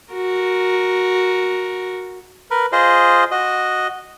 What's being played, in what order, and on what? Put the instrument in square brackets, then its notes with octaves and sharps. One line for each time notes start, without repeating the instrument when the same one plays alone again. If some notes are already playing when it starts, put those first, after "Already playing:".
[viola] F#4 A#4
[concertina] A#4 B4
F4 G#4 C5 D#5
F#4 D#5